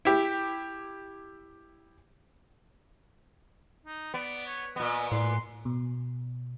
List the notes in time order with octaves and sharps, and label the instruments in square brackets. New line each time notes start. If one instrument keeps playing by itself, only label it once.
[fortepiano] E4 G4
[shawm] D#4
[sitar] B3 [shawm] D5
[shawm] C#5
[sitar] A#2 B3 [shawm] D#5
[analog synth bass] A2 [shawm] C6
[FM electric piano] B2